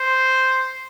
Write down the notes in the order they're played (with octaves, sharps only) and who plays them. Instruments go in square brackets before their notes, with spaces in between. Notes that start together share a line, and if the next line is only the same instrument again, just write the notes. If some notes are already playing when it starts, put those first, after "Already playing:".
Already playing: [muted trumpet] C5